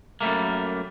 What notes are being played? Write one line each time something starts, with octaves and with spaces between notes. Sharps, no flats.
F#2 G3 A3 A#3